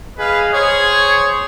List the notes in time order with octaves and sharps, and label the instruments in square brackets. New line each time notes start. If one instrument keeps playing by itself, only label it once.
[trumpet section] G#4 D#5 F5 [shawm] B4
[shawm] G#4 [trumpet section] C5 C#5